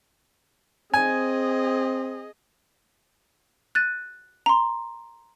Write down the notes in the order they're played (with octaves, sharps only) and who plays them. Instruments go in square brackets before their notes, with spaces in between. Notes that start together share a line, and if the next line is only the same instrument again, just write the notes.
[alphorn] C4 [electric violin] G#4 D#5 [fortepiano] G#5
[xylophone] F#6 A6 D#7
A#5 C6